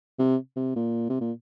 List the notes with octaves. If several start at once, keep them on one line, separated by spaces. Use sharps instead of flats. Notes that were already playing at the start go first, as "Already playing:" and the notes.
C3
C3
A#2
C3
A#2